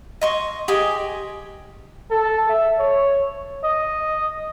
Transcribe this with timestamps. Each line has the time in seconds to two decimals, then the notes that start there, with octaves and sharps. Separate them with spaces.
0.21 D#5 C6 C#6
0.68 G4 G#4 D#5 G#5
2.11 A4
2.49 E5
2.79 C#5
3.64 D#5